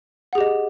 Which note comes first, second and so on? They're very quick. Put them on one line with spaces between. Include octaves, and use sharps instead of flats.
F#5 G#4 G4 D#5